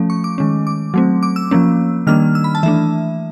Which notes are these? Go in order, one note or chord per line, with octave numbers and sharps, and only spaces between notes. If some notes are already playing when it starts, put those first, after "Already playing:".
Already playing: F3 A3 C#4
C#6
D6
D#3 G#3 C#4
D6
F#3 A3 C4
D6
E6
F3 A#3 C#4
D#3 G3 A#3 D4 F6
E6
B5
A5
E3 A3 D4 E5